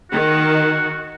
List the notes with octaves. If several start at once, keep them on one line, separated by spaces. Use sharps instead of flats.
D#3 F#4